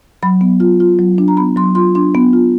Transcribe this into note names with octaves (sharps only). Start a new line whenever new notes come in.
F#3 B5
B3
F4
F4
F#3
D4
A#5
B3 B5
F#3 C6
F4 C6
D4 C6
B3
F4